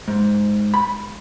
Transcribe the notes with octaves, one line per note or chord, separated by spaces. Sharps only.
G#2
B5